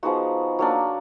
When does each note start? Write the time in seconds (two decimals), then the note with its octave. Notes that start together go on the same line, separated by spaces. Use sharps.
0.03 F3 G#3 B3 D#4 F#4
0.59 F#3 A#3 D4